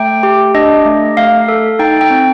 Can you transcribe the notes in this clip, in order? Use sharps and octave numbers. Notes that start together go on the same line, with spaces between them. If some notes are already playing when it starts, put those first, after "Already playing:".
Already playing: A3 G5
G4
D4 D#5
A3
A3 F5
A4
D#4 G5
G5
C4